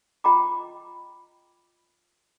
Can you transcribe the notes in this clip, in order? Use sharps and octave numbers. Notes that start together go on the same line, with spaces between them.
F4 D#5 G5 A#5 B5 D6